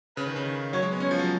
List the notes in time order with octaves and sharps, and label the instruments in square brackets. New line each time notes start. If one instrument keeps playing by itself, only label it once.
[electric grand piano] C#3 [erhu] B4
[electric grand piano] D#3
C#3
D#3
[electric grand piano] F#3 [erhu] C#5
[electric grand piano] G#3
B3
[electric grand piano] C#4 [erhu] C#5
[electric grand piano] F3
F#3